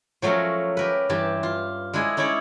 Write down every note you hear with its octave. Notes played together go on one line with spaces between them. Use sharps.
F3 F#3 A3 C#4 A#4
G4 A#4 B4
G2 E3 G4 A5
F4
G#3 D4 E4 G#4 A4 D#5
C#4 D#4 E4 C#5 D5